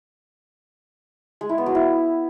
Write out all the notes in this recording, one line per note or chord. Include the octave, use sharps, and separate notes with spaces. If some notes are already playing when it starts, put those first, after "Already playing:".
G#3
E4
B3
F#3
E4